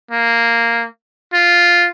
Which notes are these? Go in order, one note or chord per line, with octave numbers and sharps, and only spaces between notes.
A#3
F4